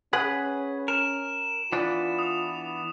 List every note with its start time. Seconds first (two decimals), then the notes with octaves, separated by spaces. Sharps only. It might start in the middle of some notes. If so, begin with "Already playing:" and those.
0.13 C#4 G#4 B4 F#5
0.88 A#4 E7
1.72 E3 B3 D4 F4
2.19 D#6 F7